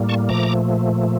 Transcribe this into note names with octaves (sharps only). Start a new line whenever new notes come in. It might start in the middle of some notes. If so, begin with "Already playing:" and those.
Already playing: A2 G3 A#3
A5 C#6
A#2 F3 A3 A#5 D6